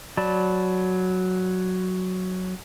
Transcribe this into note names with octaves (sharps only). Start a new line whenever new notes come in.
F#3 D5 A5 B5